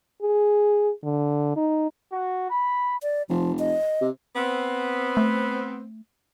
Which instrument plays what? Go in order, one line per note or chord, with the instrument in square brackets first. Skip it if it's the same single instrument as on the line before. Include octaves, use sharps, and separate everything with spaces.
[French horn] G#4
D3
D#4
[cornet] F#4
B5
[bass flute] D5
[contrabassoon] F1 [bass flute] F3
[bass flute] D#5
[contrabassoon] C3
[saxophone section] B3 C4
[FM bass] A3